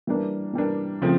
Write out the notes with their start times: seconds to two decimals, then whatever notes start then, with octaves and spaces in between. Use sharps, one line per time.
0.07 E3 G3 A#3 D4
0.54 E3 G3 A#3 D4
1.01 C#3 F3 A3 C4